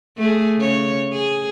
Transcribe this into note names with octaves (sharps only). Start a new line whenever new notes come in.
A3 G#4
C#3 C#5
G#4